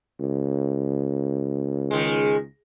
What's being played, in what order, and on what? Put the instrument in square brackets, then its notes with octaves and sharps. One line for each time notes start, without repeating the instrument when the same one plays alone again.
[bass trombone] C#2
[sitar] D#3 G#3